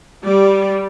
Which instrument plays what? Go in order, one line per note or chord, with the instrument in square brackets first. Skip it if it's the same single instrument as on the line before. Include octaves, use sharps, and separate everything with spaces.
[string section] G3 [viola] D5